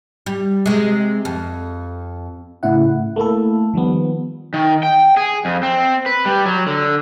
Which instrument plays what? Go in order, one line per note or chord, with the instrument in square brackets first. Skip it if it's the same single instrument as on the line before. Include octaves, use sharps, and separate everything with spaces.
[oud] G3
C3 G#3
F2
[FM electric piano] A2 C#3 E4 F#5
A3 A#3 E4 A4
D#3 F3 G3 B3
[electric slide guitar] D#3
G5
G#4
F2
C4
B4
G3
F#3
D3